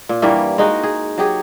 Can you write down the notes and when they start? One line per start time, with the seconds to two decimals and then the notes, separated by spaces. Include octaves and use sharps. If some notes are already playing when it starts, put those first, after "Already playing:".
0.09 A#2
0.22 G2 E3 G3 A#3
0.58 G#3 D#4 F#4
0.83 G#4
1.18 F#3 G4 G#4